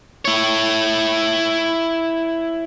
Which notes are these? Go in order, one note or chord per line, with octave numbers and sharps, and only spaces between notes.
E4 C#5